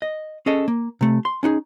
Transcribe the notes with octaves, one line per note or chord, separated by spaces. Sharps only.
D#5
C#4 G#4 A4 D#5
A#3
C3 A3
C6
C#4 D#4 F#4 G#4